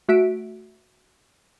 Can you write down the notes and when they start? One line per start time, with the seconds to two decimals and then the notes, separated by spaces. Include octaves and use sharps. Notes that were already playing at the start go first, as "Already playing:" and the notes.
0.09 A3 F#4 E5 B6 D7